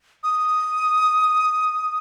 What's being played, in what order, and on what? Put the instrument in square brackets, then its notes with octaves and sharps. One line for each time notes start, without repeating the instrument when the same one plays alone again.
[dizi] D#6